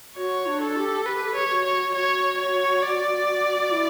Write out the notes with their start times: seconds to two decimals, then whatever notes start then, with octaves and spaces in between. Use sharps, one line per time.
0.17 F#4 C#5
0.47 D4
0.61 A4
0.76 G4
1.05 G4 B4
1.26 A4
1.35 G4 C#5
1.50 F#4
1.65 C#5
1.95 F#4 C#5
2.38 C#5
2.82 D5
3.59 F#4
3.71 E4